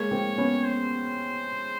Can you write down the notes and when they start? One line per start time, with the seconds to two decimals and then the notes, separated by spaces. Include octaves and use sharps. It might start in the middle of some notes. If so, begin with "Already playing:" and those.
Already playing: G#3 A#3 C#5
0.11 A#3 C4
0.38 B3 C#4
0.64 C5